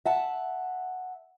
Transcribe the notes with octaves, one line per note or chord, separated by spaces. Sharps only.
E5 F#5 A5